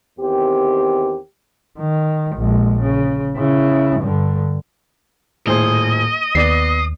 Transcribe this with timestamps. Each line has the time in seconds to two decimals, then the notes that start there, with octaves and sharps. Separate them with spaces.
0.19 E2 D#3 C4 G4
1.79 D#3
2.36 A#1 G#3
2.80 C#3
3.37 C#3 E4
4.00 G2 D3
5.47 D#1 A2 G#4 C5 D#5
6.35 D#2 B3 D5 C7